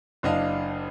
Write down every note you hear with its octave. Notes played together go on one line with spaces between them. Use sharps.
F#1 D4 D#5 F5